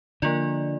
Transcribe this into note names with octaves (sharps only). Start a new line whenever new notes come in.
D3 F3 A#3 F4 D5